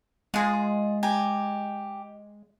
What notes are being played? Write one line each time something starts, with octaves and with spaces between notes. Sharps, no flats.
G#3 F4 G#4
G4 G#5 A#5